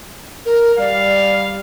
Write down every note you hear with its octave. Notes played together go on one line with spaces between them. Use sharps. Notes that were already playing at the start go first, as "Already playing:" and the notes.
A#4
G3 D5 F5